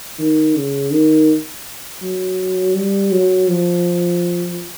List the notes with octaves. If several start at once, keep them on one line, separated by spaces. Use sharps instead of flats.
D#3
C#3
D#3
F#3
G3
F#3
F3